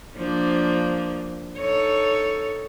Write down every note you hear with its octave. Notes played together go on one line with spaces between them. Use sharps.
F3 A#3 D4
D#4 A4 C#5